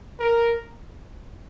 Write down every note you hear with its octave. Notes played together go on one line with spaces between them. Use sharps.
A#4